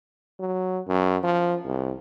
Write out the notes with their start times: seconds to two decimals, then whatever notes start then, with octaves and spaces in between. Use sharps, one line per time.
0.40 F#3
0.87 F#2
1.24 F3
1.65 C2